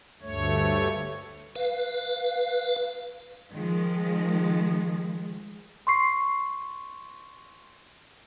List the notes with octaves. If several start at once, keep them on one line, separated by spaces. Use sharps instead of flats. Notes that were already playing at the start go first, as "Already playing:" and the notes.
D2 G2 A3 C#5
B4 F5
D#3 F3 G#3
C6 C#6 C7